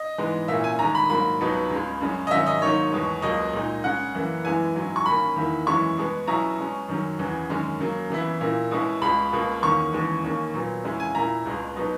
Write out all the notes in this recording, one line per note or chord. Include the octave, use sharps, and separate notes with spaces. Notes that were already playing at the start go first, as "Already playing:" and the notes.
Already playing: D#5
G#2 E3 G#3 B3
A#2 A#3 C#4 E4 E5
G#5
D#2 D#3 G#3 A#5
B5
G#2 F#3 A#3 B5
C#2 B2 F#3 B3 D#4
C#2 C#3 G#3
F#2 C#3 G#3 C#4
D#5
G#2 D#3 F#3 C#4 E5
D#5
G#2 D#3 F#3 A#3 D#4 C#5
E2 B2 G#3
C#2 B2 F#3 A#3 D#5
A#2 G#3 D#4
C#3 G#3 C#4 F#5
F#2 E3 A#3 E4
F#2 E3 G#3 B3 E4 G#5
G#2 F#3 C#4 E4
C#6
D#2 D#3 A#3 C#4 B5
E2 D#3 A#3 E4
F#2 E3 G#3 C#4 E4 C#6
B2 G#3 B3
B2 F#3 C#4 E4 A#5
B2 G#3 C#4
F#2 D#3 F#3 C#4
E2 C#3 E3
F#2 D#3 G#3 C#4
C#3 F#3 A#3
C#3 E3 B3 E4
A#2 A#3 E4
B2 G#3 C#4 E4
C#2 B2 G#3 B5
C#2 B2 A#3
E2 D#3 A#3 C#4 C#6
D#2 C#3 E3 G#3
D#2 D#3 A#3 C#4
A#2 F#3 B3
E2 C#3 G#3 C#4 E4
G#5
A#2 A#3 E4 A#5
C#2 B2 G#3
B2 F#3 B3 D#4